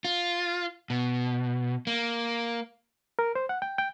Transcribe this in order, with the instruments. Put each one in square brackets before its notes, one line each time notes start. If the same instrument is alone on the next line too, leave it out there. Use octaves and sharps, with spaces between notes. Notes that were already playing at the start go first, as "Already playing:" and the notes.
[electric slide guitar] F4
B2
A#3
[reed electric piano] A#4
C5
F#5
G5
G5